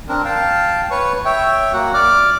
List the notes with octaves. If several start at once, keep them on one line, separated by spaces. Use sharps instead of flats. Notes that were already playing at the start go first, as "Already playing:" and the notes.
C4 D4 A#4
F5 G5 A5
B4 C#5 C#6
C#5 E5 G5
A#3 F#4 F#5
D5 D6 F6